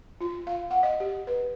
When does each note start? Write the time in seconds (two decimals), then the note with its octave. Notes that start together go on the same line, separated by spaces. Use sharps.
0.21 F4
0.47 F5
0.71 F#5
0.83 D#5
1.00 G4
1.27 B4